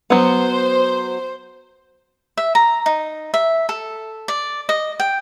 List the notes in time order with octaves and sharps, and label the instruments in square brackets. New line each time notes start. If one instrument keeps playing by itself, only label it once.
[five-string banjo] F#3 B3 [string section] C5
[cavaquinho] E5
A#5
D#4
E5
A4
D5
D#5
G5